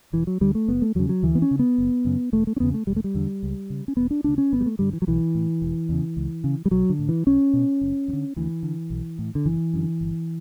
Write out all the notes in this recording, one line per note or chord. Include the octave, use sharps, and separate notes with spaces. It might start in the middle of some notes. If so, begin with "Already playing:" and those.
E1 E3
F#3
D2 D3 G3
A3
F#1 B3
A3
E2 C#3 F#3
F#3
D2 E3
B3
C#4
C#3
B3
F#1
F#2 C#3
E1 A3
A3
C#4
E2 C#3 B3
A3
E1 G3
A3
G3
E2 D3
C#2
C#3
C#4
E1 B3
D4
D2 C#3 D4
C#4
G1 B3
G3
A3
G2 D3 G3
E3
F#3
B1 E3
A2
E1
E2 C#3
C#2
C#3
G3
B1 F#3
D3
A2
E3
B1 C#4
B2
F#1
E2
D3
D2 E3
D3
B1
A2
D3
F#1 E3
F#2 D3
G1